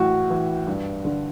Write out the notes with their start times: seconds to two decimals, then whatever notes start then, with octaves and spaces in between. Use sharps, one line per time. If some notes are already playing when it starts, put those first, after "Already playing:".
Already playing: A2 E3 F#4
0.30 E3
0.67 G2
1.05 D3